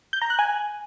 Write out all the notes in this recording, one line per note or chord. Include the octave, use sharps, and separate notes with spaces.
G6
A#5
F#6
G#5